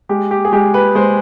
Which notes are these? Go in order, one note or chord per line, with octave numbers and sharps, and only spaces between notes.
G#3 G4
G4
G#4
G#3 G4
B4
G#3 C5